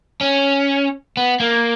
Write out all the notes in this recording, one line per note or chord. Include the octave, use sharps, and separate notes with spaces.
C#4
B3
A#3